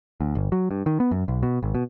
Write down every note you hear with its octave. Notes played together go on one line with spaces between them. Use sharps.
D2
G1
F#3
G2
D#3
B3
F#2
B1
B2
G#1
B2